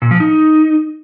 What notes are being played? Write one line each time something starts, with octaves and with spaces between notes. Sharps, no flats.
A#2
F3
D#4